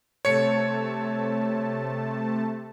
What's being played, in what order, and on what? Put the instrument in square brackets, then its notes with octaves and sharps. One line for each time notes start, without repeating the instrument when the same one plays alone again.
[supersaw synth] C3 A3 A5 [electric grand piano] C#5 C#7